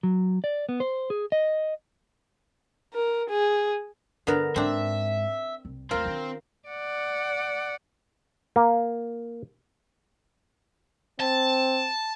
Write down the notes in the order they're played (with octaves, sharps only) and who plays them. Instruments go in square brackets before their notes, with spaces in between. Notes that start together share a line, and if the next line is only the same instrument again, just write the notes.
[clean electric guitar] F#3
D5
B3
C5
G#4
D#5
[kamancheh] A#4
G#4
[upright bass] G2 [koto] D3 B3 A#4
[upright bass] G#2 [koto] C4 D4 [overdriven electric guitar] E5
[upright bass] C2
[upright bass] D#2 A3 [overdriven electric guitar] C4 [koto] F4 A#4
[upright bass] D#3 D4
[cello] D5 F#5
[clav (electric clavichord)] A#3
[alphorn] C4 [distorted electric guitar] A5